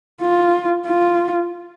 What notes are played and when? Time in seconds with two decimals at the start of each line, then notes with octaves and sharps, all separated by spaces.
0.21 F4
0.86 F4